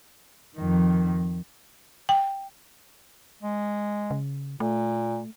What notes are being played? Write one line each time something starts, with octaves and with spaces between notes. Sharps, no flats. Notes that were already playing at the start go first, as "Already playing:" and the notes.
F2 D#3
G5
G#3
C#3
A#2 A3